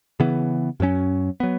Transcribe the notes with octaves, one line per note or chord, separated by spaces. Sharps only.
C#3 E3 B3
F#2 F#3 C#4
F#3 B3